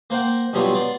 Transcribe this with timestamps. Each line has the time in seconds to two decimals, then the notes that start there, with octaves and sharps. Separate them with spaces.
0.10 A#3 C5 F#5 G5
0.53 B2 F#3 G3 B3 D4 F4
0.74 B3 D5 C6